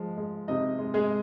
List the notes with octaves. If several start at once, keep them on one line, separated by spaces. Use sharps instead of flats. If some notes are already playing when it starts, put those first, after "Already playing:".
Already playing: F3 G#3
G#3
C3 D#4 D#5
G#3
G#3 G#4